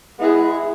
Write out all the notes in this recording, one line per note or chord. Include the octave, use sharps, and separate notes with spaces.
G#3 B3 E4 G#4